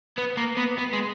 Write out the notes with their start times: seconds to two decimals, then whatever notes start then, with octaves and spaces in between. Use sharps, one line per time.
0.18 B3
0.37 A#3
0.57 B3
0.79 B3
0.93 G#3